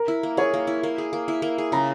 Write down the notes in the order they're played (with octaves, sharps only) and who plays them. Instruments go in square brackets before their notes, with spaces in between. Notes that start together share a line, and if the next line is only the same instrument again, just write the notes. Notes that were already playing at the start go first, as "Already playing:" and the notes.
Already playing: [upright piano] A#4
[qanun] E4
A#3
[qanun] G#4 [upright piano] C#5
[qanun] A#3
E4
A#3
G#4
A#3
E4
A#3
G#4
[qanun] C#3 [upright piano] A#5